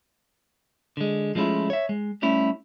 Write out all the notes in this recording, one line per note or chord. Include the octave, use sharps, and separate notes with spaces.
D3 G#3
F3 G#3 A3 C#4 E4 F4
C#5 E5
G#3
G3 A3 C#4 E4